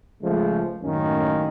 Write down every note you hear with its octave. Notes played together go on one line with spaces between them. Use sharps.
C#2 F3 G#3 A3
F#2 A2 D#3 A#3 C#4